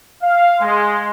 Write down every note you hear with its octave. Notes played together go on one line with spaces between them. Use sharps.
F5
G#3 C6